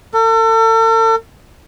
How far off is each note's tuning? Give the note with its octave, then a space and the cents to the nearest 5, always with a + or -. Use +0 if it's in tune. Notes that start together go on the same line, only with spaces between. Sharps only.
A4 +40